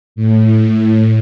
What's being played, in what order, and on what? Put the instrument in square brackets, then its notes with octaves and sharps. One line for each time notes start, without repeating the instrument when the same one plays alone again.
[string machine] A2